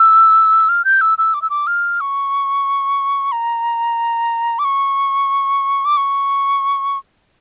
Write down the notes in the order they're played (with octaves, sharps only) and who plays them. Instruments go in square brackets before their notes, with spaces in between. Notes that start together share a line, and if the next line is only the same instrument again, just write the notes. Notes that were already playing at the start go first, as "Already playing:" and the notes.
Already playing: [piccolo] E6
F6
G6
E6
E6
D6
E6
D6
F6
C#6
A#5
D6
C#6
D6
C#6